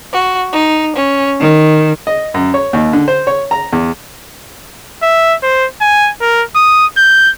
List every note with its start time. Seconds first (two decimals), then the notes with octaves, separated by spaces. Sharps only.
0.12 F#4
0.53 D#4
0.95 C#4
1.41 D#3
2.07 D#5
2.34 F#2
2.54 C#5
2.73 D#2
2.93 D3
3.08 C5
3.27 C#5
3.51 A#5
3.72 E2
5.02 E5
5.42 C5
5.81 G#5
6.21 A#4
6.55 D#6
6.97 G6